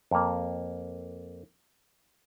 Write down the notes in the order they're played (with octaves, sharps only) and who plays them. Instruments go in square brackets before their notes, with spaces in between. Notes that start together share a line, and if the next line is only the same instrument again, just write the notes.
[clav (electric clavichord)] F2 A#3